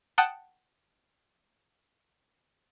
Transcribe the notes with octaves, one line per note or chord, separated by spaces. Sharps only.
F#5 G5 A5 D#6 F#6 G6